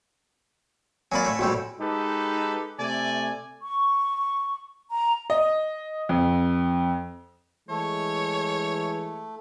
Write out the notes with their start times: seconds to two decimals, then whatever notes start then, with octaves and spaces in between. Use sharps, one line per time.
1.12 F#3 A#3 D5 G#5 B5
1.25 A2 A3
1.39 A#1 A2 G3 F#4 G5 E6
1.81 G#3 D#4 G4 A4 B4
2.79 C3 A3 D5 G#5
3.63 C#6
4.92 A#5
5.30 D#5
6.09 F2
7.69 E3 G#3 A3 C#5